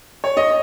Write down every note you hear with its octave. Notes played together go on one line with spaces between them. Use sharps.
C#5
D#5